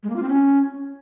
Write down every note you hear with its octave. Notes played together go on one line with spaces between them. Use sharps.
G#3
A#3
F4
C4
C#4